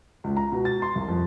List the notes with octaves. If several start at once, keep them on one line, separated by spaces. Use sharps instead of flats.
C#2
A#5
B2
A6
C6
C2
F2